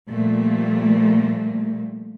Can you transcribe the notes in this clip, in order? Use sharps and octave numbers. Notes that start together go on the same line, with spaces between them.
A#2 F3 G3 A3 A#3